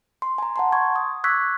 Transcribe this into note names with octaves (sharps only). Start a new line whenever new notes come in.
C6
G#5 A#5
F#5 A5 C6
C6 C#6 G#6
D#6
C#6 D6 E6 F#6 G#6 B6